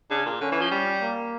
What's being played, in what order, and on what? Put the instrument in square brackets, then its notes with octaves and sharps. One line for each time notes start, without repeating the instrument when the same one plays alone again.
[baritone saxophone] C#3 [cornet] D4
[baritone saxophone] A#2
[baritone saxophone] D3 [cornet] C#4
[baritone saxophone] E3
F3
G3
[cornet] A#3